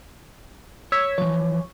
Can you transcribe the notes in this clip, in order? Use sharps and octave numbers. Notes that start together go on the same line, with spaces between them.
C#5 E6 G#6 B6
E3 F3 C#5